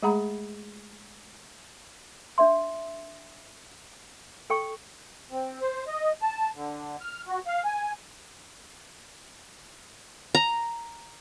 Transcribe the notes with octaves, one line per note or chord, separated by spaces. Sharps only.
G#3 A3 G#4 F#5 A#5 B5
D4 D5 E5 C6
A4 G5 C#6
C4
C5
D#5
A5
D3
F6
F#4
F5
G#5
A#5